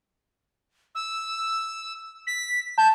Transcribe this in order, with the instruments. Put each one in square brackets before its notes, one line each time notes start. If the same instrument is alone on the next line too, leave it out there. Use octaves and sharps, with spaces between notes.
[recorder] E6
B6
[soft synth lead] A5 [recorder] G6